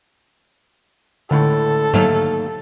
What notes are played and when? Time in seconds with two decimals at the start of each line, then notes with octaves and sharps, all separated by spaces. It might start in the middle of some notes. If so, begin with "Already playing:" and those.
1.31 C#2 A2 D3 A4
1.94 D#2 G#2 F#3 A3 F5